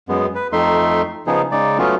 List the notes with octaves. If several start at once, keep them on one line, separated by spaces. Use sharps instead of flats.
F#2 G#3 B3
B4
F2 A3 D#4 E5 C6
C#3 F3 B3 D#4 G#4
C#3 G#3 D#4 D5
F#3 A3 B3 C#4 F4